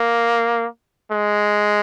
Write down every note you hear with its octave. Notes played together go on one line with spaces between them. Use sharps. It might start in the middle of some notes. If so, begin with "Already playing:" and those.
Already playing: A#3
G#3